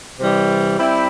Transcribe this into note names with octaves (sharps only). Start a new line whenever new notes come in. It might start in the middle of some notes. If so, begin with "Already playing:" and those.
C3 E3 G3
G3 C4 E4